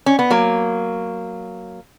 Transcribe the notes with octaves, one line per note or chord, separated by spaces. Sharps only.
C#4
B3
F#3 A#3